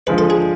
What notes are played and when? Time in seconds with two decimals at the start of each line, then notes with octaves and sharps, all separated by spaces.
0.07 D3 F3 G#3 B4
0.18 A4
0.30 G#4